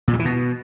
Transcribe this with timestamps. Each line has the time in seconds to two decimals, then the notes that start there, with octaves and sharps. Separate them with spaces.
0.08 A#2
0.13 G3
0.19 E3
0.25 B2